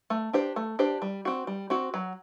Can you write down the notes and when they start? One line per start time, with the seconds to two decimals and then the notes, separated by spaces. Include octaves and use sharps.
0.10 A3
0.33 D4 G4 C5
0.56 A3
0.79 D4 G4 C5
1.02 G3
1.25 C4 F#4
1.47 G3
1.70 C4 F#4
1.94 F#3